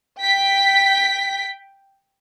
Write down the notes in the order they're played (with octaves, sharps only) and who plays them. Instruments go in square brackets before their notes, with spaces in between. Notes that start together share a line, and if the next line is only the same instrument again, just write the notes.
[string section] G5 B6